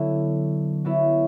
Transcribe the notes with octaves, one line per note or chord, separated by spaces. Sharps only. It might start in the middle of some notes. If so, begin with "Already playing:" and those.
Already playing: D3 F#3 B3 E4
F#3 B3 E4